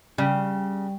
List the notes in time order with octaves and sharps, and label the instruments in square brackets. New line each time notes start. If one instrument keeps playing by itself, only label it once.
[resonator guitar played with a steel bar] C#3 [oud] G3